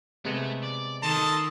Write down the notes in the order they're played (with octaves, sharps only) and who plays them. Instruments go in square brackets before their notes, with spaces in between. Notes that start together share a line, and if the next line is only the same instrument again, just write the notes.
[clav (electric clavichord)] C3 G#3 B3 [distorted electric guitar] A3
[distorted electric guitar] D5
[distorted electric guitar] D#3 [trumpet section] A4 A5 [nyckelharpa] D#5 C6